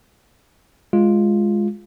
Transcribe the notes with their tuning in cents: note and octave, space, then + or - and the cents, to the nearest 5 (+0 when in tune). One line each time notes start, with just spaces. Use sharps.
G#3 +0 F4 +0